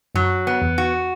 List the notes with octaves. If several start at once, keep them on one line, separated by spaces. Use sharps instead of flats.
F#2 F#3
B3
E2
F#4